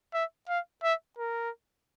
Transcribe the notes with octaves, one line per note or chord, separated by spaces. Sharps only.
E5
F5
E5
A#4